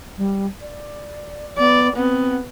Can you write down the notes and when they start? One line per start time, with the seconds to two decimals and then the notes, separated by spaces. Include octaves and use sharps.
0.17 G3
0.61 D5
1.58 B3 D5
1.97 B3 C4